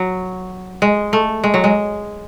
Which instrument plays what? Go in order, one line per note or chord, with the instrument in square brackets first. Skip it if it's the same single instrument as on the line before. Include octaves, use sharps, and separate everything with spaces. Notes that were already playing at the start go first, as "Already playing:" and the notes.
Already playing: [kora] F#3
G#3
A3
G#3
F#3
G#3